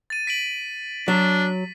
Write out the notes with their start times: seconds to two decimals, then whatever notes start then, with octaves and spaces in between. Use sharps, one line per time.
0.10 A6 D#7
0.27 B6 D7 F#7
1.08 F#3 D4 B6